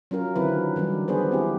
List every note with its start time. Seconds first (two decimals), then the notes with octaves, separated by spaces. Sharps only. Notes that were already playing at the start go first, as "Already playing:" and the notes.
0.11 F#3 C#4 F4 A#4
0.36 D3 D#3 F#3 C4 E4 B4
0.76 D#3 E3 G3 D4
1.08 B3 D4 G#4 B4 C5
1.31 C4 E4 G4